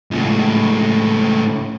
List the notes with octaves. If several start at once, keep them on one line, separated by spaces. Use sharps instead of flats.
C#2 A2